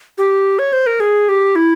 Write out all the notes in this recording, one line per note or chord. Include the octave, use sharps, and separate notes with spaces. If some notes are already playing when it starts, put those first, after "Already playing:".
G4
C#5
C5
A#4
G#4
G4
E4